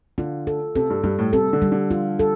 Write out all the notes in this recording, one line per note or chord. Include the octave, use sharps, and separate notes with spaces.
D3 F4
A4
C3 A4
G2
G2 G3
A2
C3 A4
D3
G3
D3
F4
A4